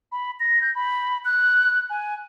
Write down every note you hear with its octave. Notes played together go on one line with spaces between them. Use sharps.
B5
A#6
G6
B5
F#6
G#5